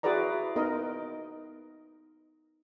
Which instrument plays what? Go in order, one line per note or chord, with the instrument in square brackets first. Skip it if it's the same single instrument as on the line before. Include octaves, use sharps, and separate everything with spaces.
[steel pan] E4 F#4 G#4 B4 D5 A#5
B3 D#4 A#4 D#5